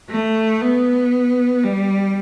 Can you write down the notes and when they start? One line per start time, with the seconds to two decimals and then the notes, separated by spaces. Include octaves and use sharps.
0.10 A3
0.61 B3
1.63 G3